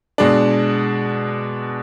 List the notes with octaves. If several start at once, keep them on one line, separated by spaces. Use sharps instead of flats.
B2 G#3 D4